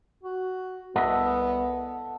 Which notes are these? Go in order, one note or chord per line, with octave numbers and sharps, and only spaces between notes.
F#4
C2 B3 A4 D#5 E5 F#5